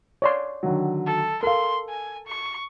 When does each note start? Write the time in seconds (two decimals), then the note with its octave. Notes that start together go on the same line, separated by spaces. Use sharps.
0.22 C#5 D5 C6
0.63 D3 D#3 F#3
1.06 A4
1.43 A4 A#4 F5 C6
1.89 G#5
2.27 C#6